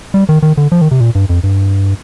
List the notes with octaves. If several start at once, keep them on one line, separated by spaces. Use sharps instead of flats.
G3
D#3
D#3
D3
F3
D#3
C3
A#2
G2
F2
G2